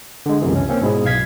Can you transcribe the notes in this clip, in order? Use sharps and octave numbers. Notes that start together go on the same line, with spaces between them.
D3 G#3
C#2 F#2 C3 E3
C#4
A#3 C4 C#4
G#2 B2 E4 G#4
B1 F5 G#6 B6